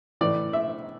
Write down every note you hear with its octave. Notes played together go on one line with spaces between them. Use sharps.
A2 E3 D5
E5